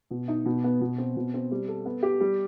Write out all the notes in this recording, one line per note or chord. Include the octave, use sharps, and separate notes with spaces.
B2
D#4
B2
B3
B2
C4
B2
C4
G3
A4
B3
G4
G3